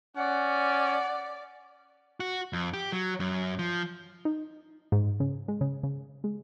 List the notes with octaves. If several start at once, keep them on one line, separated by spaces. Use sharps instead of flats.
C#4 D5 F#5
F#4
F2
G4
F#3
F#2
F3
D#4
G#2
C#3
G#3
C#3
C#3
G#3